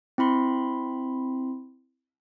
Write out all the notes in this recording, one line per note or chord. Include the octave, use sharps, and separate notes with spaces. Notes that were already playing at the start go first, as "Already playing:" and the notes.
C4 E4 B5 C6